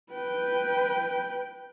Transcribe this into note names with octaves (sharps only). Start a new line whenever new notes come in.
B4 G5